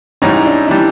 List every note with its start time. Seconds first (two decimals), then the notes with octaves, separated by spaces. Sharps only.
0.22 G#2 E3 G3 C#4 D#4
0.36 D#4
0.45 D4 E4
0.68 E3 G3 D4 E4